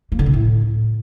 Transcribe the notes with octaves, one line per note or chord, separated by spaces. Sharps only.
A#3
D3
A#2
A2